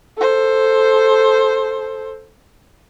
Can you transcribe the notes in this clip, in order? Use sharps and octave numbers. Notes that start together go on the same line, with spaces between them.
A4 C5